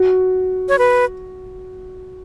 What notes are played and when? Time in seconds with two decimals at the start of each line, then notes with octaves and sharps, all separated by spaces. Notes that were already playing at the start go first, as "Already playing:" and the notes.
Already playing: F#4
0.69 C#5
0.79 B4